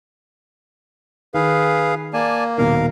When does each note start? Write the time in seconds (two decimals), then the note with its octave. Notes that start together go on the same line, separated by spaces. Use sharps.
1.34 D#3 G#4 B4 F5
2.13 A#3 D5 G#5 A5
2.58 D#1 B2 D#3 A#4 F5